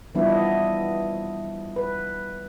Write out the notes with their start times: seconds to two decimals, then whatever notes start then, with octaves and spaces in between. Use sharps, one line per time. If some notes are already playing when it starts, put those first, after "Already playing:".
0.15 E3 F3 G3 B3 D4 E4
0.29 D#5
1.76 B4